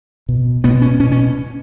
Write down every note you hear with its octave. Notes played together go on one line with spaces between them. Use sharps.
B2
B2 B3
C#4
B2 C#4
C#4